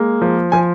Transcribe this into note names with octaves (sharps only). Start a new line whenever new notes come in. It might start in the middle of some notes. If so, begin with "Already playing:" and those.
Already playing: G#3 A#3
F3
F3 G#5